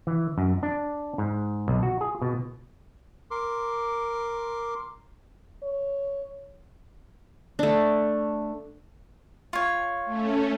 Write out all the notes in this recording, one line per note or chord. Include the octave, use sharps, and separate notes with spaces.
E3
F#2
D4
G#2
B1
F#4
G#4
B2
A#4 C6 D6
C#5
A3 D4
F4 C#5
A3 C#4